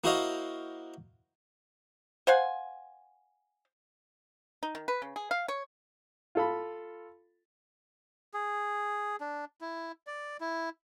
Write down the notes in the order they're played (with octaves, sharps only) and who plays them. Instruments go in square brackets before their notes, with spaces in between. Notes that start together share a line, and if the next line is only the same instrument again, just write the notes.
[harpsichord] A#3 E4 F#4 C5 D#5 F5
[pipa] C5 F5 F#5 G#5
D#4
D#3
B4
C#3
G#4
F5
C#5
[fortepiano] F4 A4 B5
[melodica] G#4
D4
E4
D5
E4